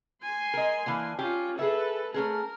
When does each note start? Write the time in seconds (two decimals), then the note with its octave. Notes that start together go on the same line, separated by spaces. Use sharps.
0.23 G#5 C6
0.54 A#4 D#5
0.86 E3 A#3 D4
1.19 C#4 F4 G4
1.59 G#4 A4 B4 E5
2.14 A3 C#4 G#4 A#4